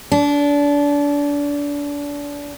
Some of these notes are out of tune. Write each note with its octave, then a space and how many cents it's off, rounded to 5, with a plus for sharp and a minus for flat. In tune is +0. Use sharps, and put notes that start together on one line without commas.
D4 -30